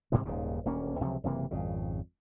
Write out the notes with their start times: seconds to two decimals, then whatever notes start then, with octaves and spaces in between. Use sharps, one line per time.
0.12 G#2 C3 E3 G#3
0.25 D#1 D#2 G#2 C#3
0.65 D#1 D2 A#3 C#4
1.00 C#2 C3 F3 F#3
1.24 F#1 C3 E3 A#3
1.51 G#1 F2 C#3